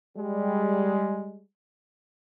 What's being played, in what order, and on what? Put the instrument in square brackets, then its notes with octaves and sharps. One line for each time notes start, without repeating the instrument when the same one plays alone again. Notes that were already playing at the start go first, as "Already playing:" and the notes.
[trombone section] G3 G#3